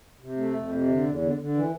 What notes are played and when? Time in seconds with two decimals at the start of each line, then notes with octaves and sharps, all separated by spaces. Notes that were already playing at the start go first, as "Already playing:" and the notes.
0.20 C3
0.37 A3
0.54 F2
0.71 C3
0.87 D3
1.05 E2
1.22 D3
1.38 D3
1.55 E3